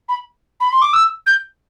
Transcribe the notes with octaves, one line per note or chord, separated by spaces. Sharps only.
B5
B5
C6
D6
E6
G6